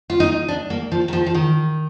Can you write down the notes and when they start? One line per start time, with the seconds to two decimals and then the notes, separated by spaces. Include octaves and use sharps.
0.10 F4
0.20 D#4
0.48 D4
0.70 A#3
0.92 F3
1.08 D#3
1.13 F3
1.26 F3
1.35 D#3